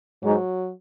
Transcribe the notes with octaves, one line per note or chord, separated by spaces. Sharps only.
G#2 F#3